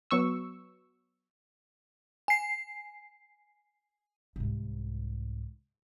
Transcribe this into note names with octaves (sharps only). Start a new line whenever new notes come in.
F#3 B3 C#6 E6
G#5 C7
C2 G#2